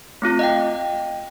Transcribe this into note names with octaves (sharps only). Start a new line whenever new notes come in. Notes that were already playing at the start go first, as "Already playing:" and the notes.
A3 C4 F4
D#5 F5 G5